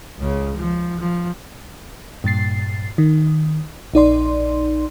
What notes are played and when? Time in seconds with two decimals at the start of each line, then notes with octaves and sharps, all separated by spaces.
0.18 C#2 C#3
0.57 F3
0.99 F3
2.24 G2 A#2 A6 C7
2.98 D#3
3.94 A#1 D#4 D5 C6